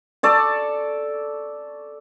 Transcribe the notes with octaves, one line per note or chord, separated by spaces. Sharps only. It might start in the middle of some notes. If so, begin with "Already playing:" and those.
A4 D5 C#6